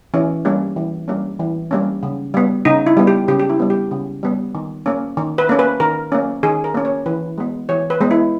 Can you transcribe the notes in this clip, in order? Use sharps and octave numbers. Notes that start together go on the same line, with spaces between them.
E3 C#4
G3 A#3 C#4
E3
G3 A#3 C#4
E3
G3 A#3 C#4
C#3
G3 B3
C#3 D#4
E4
G3 B3
G4
C#3 G4
G4
E4
G3 B3
G4
C#3
G3 B3
D#3
A#3 C#4
D#3
B4
A#3 C#4
B4
D#3 A#4
A#3 C#4
D#3 G#4
A#4
A#3 C#4
C#5
E3 B4
G#3 B3
E3 C#5
B4
G#3 B3
E4